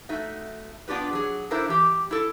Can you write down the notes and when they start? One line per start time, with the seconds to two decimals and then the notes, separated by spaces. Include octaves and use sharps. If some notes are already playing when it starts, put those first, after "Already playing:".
0.09 A3 D#4 F#4 E5
0.88 B3 D4 F4 G4 B4
1.13 F#3 G#4
1.51 D4 E4 A4 A#4 C5 E5
1.68 E3 G4
2.11 E4 A4